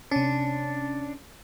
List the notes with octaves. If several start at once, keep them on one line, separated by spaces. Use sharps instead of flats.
C3 C#4 D4